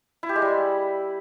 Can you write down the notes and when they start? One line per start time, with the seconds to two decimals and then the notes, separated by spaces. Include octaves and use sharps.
0.23 E4
0.29 G4
0.36 G#3
0.42 G3